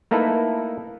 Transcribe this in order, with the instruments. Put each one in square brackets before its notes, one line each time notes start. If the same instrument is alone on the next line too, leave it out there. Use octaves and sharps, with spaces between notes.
[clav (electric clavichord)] A3 A#3 D#4 E4 A4 B4